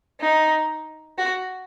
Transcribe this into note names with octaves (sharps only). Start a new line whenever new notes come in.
D#4
F#4